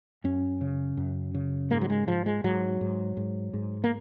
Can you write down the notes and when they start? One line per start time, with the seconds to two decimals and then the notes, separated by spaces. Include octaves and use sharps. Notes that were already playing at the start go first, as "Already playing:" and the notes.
0.24 F#2 C#4
0.61 C#3
0.97 F#2
1.34 C#3
1.70 G#2 A#3
1.81 F#3
1.90 G#3
2.07 G#2 F3
2.26 G#3
2.44 G#2 F#3
2.81 G#2
3.17 G#2
3.53 G#2
3.84 A#3